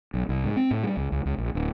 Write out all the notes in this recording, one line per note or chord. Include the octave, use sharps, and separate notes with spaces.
B1
C2
G#2
C4
A2
G3
C#2
C#2
C#2
A#1
D1